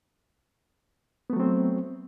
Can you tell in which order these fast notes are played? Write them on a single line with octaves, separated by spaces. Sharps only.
B3 A3 F#3 C4